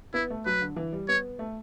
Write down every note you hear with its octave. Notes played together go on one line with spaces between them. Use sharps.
B3 E4
A3
F#3 B4
D3
E3
G3
B3 C#5
A3